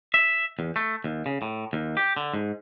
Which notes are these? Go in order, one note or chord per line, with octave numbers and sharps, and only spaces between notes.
E5
E2
A3
D#2
C#3
A2
D#2
G4
D3
G#2